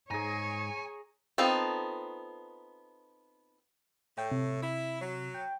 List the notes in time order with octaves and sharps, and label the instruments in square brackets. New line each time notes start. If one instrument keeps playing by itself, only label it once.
[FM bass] G#2 [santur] G#4 A#5 [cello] C#5 [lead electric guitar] G#5
[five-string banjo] B3 C4 D#4 F4 A4
[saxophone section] A2 [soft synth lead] G5
[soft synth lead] C3
[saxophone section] E4
F#3
[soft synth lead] G5